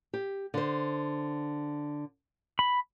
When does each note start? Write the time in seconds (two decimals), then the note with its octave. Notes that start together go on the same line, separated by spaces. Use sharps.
0.13 G4
0.54 D3 C5
2.59 B5